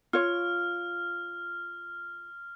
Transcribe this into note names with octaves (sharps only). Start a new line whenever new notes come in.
F4 C#5 F6